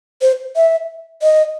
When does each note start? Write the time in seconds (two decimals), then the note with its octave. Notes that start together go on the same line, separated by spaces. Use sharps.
0.22 C5
0.56 E5
1.22 D#5